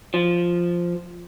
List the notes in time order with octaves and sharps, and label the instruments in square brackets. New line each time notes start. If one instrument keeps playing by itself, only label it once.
[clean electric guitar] F3